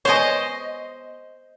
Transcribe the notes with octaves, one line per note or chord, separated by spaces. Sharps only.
G#3 B3 C5 C#5 D#5